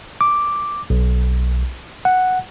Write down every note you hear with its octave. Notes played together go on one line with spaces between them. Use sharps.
D6
B1
F#5